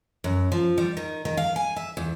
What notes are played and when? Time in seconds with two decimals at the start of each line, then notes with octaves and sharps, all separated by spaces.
0.24 F#2
0.52 F3
0.78 G3
0.97 D#3
1.25 D#3
1.37 F5
1.56 G#5
1.76 E5
1.97 E2